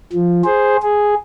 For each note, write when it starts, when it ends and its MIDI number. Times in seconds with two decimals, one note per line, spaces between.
0.13 0.42 53
0.44 0.76 68
0.44 0.76 72
0.82 1.14 68